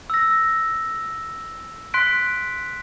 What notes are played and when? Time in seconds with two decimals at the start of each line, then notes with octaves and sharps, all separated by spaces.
0.10 E6 A#6
1.94 C6 F#6 B6 D7